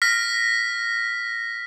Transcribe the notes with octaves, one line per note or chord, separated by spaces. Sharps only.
F6 A#6 B6